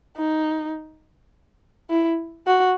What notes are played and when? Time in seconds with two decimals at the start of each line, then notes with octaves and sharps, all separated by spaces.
0.17 D#4
1.90 E4
2.47 F#4